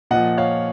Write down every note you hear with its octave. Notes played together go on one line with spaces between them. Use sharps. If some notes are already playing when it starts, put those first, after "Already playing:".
A#2 F3 D#5 F#5
C#5 F5